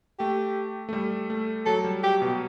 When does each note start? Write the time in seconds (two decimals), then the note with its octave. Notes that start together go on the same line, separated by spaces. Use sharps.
0.19 A3 G4
0.89 A3
0.93 G3
1.30 A3
1.66 F#3 A4
1.84 G3
2.03 G4
2.22 B2